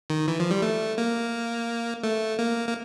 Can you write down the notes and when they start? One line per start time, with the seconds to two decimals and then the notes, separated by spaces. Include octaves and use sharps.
0.10 D#3
0.28 E3
0.40 F3
0.51 G3
0.62 A3
0.98 A#3
2.03 A3
2.39 A#3
2.69 A#3